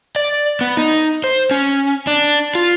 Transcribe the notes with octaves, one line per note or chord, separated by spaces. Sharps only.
D5
B3
D#4
C5
C#4
D4
F4